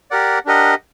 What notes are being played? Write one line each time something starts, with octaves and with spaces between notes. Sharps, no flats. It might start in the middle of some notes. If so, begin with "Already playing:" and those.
G4 A#4 D5 F#5
D4 G4 A#4 D#5 F#5